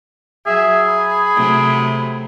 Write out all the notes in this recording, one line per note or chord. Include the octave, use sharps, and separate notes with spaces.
F#3 G#4 E5
B5
C3 F#3 A3